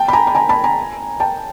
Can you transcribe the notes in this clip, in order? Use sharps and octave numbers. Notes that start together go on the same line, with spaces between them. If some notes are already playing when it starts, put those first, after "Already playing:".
Already playing: G5 A5
B5
G#5 A#5
B5
G#5 A#5
A5 B5
G#5 A#5
G5 A5